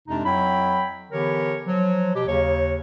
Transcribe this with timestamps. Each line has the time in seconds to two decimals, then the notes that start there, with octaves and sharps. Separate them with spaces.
0.08 F2 C3 G#3 D4 D#4
0.25 F2 F#3 E4 G5 B5
1.11 D3 E3 B3 G4 A#4 C#5
1.66 F3 F#3
2.14 B2 G4
2.27 D#2 C#3 C#5